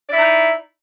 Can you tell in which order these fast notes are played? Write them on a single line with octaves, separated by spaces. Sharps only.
D5 E4 D#4